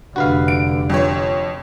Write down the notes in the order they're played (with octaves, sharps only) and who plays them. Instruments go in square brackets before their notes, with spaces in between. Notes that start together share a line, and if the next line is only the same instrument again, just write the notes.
[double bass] F1 D3 [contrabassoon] G2 [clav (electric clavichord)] F#4 B4 F5
[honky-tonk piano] D7
F2 C#5